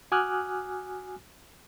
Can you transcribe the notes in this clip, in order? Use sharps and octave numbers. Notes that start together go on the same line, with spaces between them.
F#4 G#5 D6 D#6 F6 F#6